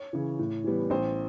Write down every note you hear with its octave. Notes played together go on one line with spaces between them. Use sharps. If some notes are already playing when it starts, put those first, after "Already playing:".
Already playing: C#5
C#3 E3
A2
E3 G3 B3
A1 C5